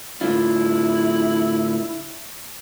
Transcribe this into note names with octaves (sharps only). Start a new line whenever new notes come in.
A2 D3 E4 F4